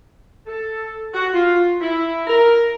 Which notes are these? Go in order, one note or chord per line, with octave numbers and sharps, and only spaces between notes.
A4
F#4
F4
E4
A#4